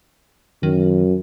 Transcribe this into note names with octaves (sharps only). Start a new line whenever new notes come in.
F#2 D#3